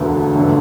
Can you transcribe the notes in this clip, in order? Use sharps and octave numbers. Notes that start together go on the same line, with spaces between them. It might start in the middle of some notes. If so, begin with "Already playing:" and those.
Already playing: E1 D2 D3 B3
G1 D3